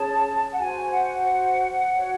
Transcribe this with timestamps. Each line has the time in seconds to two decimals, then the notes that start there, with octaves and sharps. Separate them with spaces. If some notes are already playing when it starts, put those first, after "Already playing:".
Already playing: C#4 G#4 C#5 A5
0.52 F#5
0.58 F#4 C5 G#5
0.93 F#5
1.94 F#4 C#5